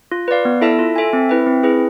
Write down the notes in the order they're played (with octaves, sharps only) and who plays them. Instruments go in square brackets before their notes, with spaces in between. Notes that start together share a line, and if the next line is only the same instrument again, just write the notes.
[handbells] F4
B4 D5 F5
B3
E4 A4 E5 A5
F4
A4 E5 G#5
C4
E4 B4 E5
C4
E4 G#4 B4